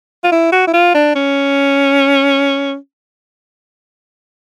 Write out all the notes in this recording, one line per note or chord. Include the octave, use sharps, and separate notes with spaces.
F4
E4
F#4
E4
F4
D4
C#4